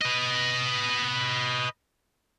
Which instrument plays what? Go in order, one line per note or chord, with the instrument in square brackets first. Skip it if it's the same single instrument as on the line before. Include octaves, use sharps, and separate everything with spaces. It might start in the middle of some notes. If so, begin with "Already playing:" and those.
[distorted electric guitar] B4 D#5